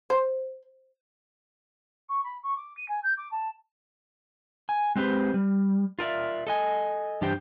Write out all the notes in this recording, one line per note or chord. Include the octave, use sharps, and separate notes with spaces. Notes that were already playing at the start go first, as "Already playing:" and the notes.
C5
C#6
B5
C#6
D6
D#7
G#5
G6
D6
A5
G#5
G#3 C4 G4 B4 C5
G3
F4 A#4 D5 E5
A4 D#5 G#5
G2 E3 D4 G4 C5 G5